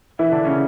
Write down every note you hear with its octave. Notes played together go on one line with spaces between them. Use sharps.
E3 E4
D3 D4
C#3 C#4